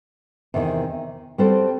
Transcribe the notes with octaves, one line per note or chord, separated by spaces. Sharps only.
E2 C3 D#3
G3 C4 F#4 A4 C5